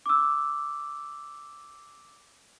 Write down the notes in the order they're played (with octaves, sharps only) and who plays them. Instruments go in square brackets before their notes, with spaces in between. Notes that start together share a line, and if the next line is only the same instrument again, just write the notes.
[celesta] D6 E6